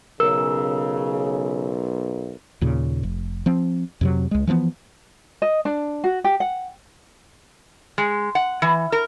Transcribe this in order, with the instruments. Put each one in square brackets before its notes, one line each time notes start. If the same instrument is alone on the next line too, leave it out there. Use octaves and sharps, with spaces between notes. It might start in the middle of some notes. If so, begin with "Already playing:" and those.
[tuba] B1 [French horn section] C#3 [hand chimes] A#4 [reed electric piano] E6
[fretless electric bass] D#2 A#2 C#3
F1
F3 C4
F2 C3 F#3
C#2 G#3
E3 F3 A3 B3
[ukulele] D#5
D4
F#4
G4
F#5
[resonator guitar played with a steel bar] G#3
F#5
E3
A#4